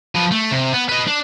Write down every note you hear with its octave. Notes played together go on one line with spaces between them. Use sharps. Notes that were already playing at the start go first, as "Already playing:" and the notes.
F3 B4
A3
C3
B3
B4 D#5
D4